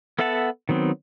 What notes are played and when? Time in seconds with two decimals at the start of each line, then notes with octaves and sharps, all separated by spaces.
0.19 B3 A4 E5 F#5 A5
0.69 D#3 F#3 B3 C4